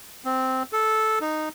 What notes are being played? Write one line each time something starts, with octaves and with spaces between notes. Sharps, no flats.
C4
A4
D#4